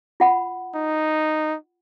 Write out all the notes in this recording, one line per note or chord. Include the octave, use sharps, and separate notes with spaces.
F4 F#5 B5
D#4